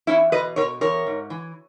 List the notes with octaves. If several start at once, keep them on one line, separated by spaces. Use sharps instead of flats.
E2 C#4 E4
B2 B4 D#5
B2 A#4 C#5
E2 A#4 C#5
G#2
E3